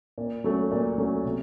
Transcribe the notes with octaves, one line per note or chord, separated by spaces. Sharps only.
A#2
F#3 A3 C#4
A#2
F#3 A3 C#4
C3